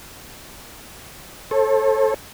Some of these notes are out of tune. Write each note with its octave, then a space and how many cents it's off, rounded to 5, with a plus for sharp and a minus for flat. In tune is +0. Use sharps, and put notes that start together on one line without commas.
A4 +0 C#5 -45